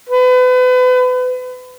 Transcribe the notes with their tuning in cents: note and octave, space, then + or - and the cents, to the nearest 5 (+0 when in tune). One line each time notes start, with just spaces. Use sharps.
B4 +35